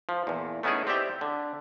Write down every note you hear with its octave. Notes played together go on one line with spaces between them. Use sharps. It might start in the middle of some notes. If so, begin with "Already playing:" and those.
F3
E2 A#2
A3 B3 C#4 D#4 E4 G#4
C4 G4 D5 E5 G5
D3